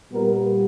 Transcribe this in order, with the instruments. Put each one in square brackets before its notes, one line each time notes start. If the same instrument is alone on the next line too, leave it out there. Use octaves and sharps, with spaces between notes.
[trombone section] A#2 G3 B3 A#4